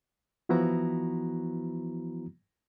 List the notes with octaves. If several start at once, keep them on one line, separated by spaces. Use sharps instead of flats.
E3 F3 B3 E4 F#4 A#5